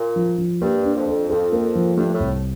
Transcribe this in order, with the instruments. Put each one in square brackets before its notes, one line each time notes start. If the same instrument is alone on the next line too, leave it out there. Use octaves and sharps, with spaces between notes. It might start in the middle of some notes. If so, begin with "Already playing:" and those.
Already playing: [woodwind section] A#2
[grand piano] F3
F3
[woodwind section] G2 [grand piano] A#3
[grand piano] D4
[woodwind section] F2
[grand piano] A4
[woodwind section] F2 [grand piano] A4
[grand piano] A#3
F3
[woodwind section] G2 [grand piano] A3
[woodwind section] A2
[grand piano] C2